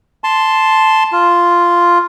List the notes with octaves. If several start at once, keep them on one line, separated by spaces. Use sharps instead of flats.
A5 C6
F4